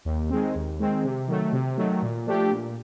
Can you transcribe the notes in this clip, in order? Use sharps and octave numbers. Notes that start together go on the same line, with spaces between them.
D#2
D#3 G#3 C4
D#2
D#3 G#3 C4
C3
D#3 F#3 A3
C3
D#3 F#3 A3
A#2
F3 A3 D4 G4
A#2